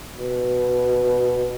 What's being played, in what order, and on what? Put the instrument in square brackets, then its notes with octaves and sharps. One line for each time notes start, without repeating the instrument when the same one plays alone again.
[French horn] B2